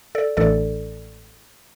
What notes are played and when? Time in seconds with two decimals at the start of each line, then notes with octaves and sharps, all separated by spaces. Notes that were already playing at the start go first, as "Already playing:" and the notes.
0.15 A4 D5
0.37 A1 A2 E3 A3 D4 A4 D5